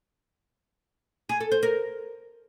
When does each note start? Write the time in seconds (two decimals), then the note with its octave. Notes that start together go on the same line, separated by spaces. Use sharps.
1.29 G#4
1.40 A4
1.52 C5
1.63 A#4